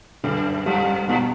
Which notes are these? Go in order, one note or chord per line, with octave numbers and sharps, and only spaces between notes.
F#2 D3
G2 G3
G2 B2